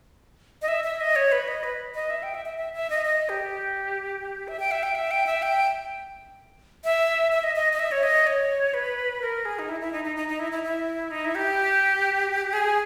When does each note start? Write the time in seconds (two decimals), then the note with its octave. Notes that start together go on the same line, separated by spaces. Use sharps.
0.62 D#5
0.68 E5
0.84 E5
1.00 D#5
1.16 C#5
1.32 B4
1.48 D#5
1.64 B4
1.95 D#5
2.10 E5
2.23 G5
2.34 E5
2.46 E5
2.58 E5
2.74 E5
2.90 D#5
3.06 D#5
3.29 G4
4.48 E5
4.60 G5
4.71 E5
4.83 G5
4.95 E5
5.11 G5
5.27 E5
5.42 G5
6.84 E5
7.32 E5
7.43 D#5
7.56 D#5
7.73 D#5
7.79 E5
7.91 C#5
8.03 D#5
8.27 C#5
8.74 B4
9.22 A#4
9.45 G#4
9.59 D#4
9.69 E4
9.81 E4
9.92 D#4
10.04 D#4
10.16 D#4
10.28 D#4
10.39 E4
10.52 E4
10.63 E4
11.11 D#4
11.25 E4
11.35 G4
12.53 G#4